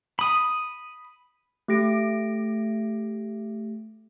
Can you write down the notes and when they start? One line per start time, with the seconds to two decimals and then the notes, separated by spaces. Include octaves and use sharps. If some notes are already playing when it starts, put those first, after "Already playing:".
0.19 B5 D#6
1.68 A3 G4 A#6 D7